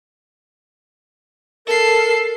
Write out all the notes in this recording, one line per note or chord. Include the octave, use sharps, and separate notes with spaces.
A4 A#4 C7